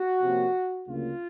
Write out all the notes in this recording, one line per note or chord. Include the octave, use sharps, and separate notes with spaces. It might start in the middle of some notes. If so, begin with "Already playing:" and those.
Already playing: F#4
C3 F3 A#3 C#4
D2 C#3 F#3 A#3 F4